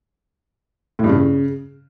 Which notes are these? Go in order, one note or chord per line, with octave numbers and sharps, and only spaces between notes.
A2
G2
C#3